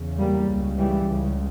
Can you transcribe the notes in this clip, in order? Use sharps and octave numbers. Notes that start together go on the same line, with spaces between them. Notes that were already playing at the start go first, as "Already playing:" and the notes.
Already playing: E2 C#3
G3 A#3
C#2 C#3
E3 G3
C#2 C#3